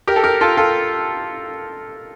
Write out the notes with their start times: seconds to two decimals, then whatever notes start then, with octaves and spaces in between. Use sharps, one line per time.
0.08 G4 A#4
0.16 A4
0.23 G4 A#4
0.41 F4 A4
0.57 F4 A4